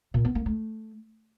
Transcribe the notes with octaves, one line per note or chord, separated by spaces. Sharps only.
A#2
B3
A#3
A3